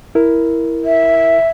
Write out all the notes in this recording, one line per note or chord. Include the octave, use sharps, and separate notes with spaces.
E4 A#4
E5